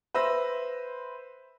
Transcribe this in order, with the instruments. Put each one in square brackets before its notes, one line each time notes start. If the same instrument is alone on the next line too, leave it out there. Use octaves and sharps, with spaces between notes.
[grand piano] B4 C5 E5 E6 A#6